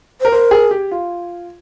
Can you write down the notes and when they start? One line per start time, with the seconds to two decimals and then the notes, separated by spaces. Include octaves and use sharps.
0.21 A#4 C5
0.32 A#4 C5
0.51 G#4
0.71 G4
0.91 F4